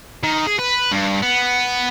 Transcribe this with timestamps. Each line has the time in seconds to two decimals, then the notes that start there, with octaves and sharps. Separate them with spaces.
0.23 D#3
0.47 G#4
0.59 B4
0.91 G2
1.22 B3